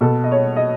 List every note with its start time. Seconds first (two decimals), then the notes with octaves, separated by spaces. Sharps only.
0.01 B2 A4
0.24 D#5
0.32 C#5
0.56 D#5